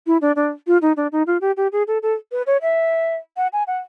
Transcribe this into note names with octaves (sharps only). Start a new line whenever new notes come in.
E4
D4
D4
F4
D#4
D4
D#4
F4
G4
G4
G#4
A4
A4
B4
C#5
E5
F#5
G#5
F#5